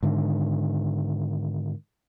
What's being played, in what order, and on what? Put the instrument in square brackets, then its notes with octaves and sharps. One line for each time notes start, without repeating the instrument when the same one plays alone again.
[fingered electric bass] G#2 D3 D#3